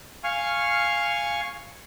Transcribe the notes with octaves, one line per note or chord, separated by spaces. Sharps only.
F5 G#5 C#6 F6